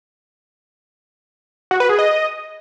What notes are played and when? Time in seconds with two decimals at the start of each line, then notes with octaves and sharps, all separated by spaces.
1.71 F#4
1.80 B4
1.89 G#4
1.99 D#5